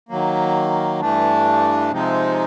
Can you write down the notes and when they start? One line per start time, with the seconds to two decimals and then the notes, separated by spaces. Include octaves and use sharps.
0.09 D#3 F#3 A#3
1.01 G2 E3 A3 D4
1.91 C3 F3 G#3 C4 D#4